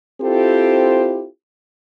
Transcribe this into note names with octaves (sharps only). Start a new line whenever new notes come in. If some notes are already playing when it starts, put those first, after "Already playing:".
C4 E4 F4 G4 A4 C5